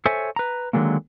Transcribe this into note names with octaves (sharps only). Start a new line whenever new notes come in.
A4 C5 C#5 E5 G#5
B4 A#5
D3 D#3 F#3 G#3 A#3